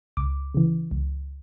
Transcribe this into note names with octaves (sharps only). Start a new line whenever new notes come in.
C#2 D6
C#3 E3
C#2